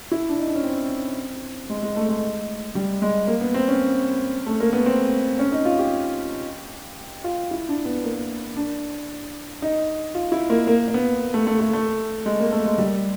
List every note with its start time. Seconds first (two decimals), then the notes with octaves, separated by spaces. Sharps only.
0.12 E4
0.29 D4
0.39 D#4
0.48 D4
0.55 C#4
0.63 C4
1.70 G#3
1.82 G#3
1.96 A3
2.09 G#3
2.75 G3
3.02 G#3
3.27 A#3
3.41 B3
3.54 C4
3.68 C#4
4.46 A3
4.60 A#3
4.73 B3
4.86 C4
5.39 C#4
5.52 D#4
5.65 F4
5.79 G4
7.24 F4
7.51 E4
7.69 D4
7.85 B3
8.04 A#3
8.56 D4
9.62 D#4
10.15 F4
10.32 E4
10.50 A#3
10.67 A#3
10.88 A#3
10.94 B3
11.34 A3
11.47 A3
11.60 A3
11.73 A3
12.26 G#3
12.40 A#3
12.52 A3
12.66 G#3
12.78 G3